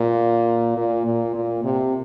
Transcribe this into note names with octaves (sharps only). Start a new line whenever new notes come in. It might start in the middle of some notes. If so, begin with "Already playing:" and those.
Already playing: A#2
A#2
A#2
A#2
C3